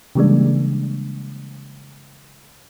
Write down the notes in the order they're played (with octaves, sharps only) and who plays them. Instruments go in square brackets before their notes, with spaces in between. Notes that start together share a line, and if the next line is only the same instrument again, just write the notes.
[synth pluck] C#3 E3 G3 G#3 A#3 D4